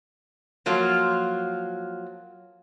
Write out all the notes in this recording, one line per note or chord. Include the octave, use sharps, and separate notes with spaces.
F3 F#3 A#3 F4